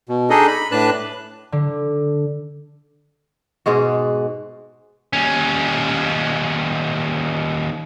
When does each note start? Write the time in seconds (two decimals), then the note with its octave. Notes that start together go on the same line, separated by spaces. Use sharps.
0.09 B2
0.30 D4 D#4 G#4 A4 D#5
0.48 B5
0.72 A2 D4 B4 A5 F#6
1.52 D3
3.66 G#2 B2 G#3 F#4
5.13 D#2 C#4